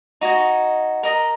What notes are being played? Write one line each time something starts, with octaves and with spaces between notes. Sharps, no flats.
D#4 F#4 D#5 G#5
A#4 D#5 A#5